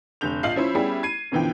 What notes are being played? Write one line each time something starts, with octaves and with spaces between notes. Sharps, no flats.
F1 D3 G6 F7
A#1 F4 D#5 F5 C7 F#7
F3 C#4 E4 C5
G3 B3 C#4 E4 G4 G#4
G#6 C7 D#7
F#2 B2 D3 E3 F3 G5